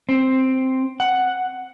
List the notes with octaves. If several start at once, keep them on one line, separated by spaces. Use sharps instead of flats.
C4
F#5